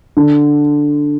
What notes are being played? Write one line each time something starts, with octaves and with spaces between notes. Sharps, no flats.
D3